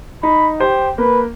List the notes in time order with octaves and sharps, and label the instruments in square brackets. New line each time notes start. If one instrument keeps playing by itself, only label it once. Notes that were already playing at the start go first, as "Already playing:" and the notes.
[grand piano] D#4 [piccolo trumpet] B5
[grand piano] G4 C5 [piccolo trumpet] G5
[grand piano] A#3 [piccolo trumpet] B4